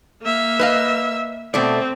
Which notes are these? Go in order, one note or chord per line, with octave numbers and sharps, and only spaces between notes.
A#3 E5
B4 D#5 F5
B2 A3 C4 D5